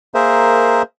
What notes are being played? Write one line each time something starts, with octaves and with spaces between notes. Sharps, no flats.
A#3 G#4 A#4 C5 E5